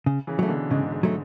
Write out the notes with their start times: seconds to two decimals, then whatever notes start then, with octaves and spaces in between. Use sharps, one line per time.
0.06 C#3
0.27 C#3 E3
0.39 F#3 A3
0.49 B2 D3
0.70 G#2 C#3
0.92 G#2
1.03 F#3 A3